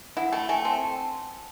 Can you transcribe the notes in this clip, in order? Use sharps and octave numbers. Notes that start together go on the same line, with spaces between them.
E4 F#5
A3 G5
A3 G#5
C4 A5